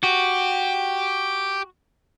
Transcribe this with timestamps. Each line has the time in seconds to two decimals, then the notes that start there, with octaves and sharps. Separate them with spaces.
0.03 F#4 G4